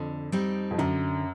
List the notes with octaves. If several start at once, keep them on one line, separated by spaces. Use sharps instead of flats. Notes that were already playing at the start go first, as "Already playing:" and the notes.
Already playing: F2 D3
G3 C4 D#4
F2
F#2 D3